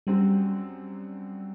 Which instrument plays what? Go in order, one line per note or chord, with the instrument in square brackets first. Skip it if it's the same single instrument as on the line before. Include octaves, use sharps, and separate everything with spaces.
[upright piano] F#2 F#3 C4 [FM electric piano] G3